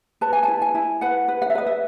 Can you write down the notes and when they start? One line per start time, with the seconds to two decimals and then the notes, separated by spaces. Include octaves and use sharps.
0.21 B4 A5
0.33 G#5
0.43 E4 A5
0.62 G#5
0.75 E4
1.01 B4 F#5
1.28 B4
1.42 F#5
1.50 E5
1.55 B4 D#5
1.66 E5